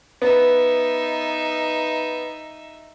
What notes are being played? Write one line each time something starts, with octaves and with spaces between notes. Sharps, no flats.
B3 D#4 E5